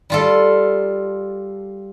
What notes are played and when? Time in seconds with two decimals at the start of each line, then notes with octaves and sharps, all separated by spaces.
0.10 G3 F4 A4